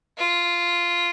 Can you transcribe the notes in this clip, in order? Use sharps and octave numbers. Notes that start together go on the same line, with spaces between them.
F4